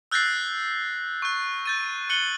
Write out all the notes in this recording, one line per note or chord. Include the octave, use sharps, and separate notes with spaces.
E6 F#6 G6 A6 A#6 C7
C#6 F#6
G6 A6 D#7
F#6 C#7 F#7 G7